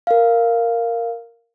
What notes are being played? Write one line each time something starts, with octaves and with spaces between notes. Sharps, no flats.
A#4 F5